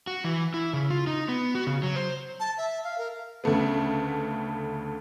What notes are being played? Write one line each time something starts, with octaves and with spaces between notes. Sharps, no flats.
F#4
E3
E4
C#3
F4
D#4
B3
F#4
C#3
F#3
C5
A5
E5
F5
A#4
D2 C#3 A3 B3